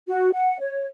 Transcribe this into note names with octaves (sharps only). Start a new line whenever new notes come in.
F#4
F#5
C#5